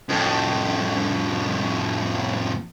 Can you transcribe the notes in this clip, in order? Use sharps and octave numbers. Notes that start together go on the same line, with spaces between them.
F2 A2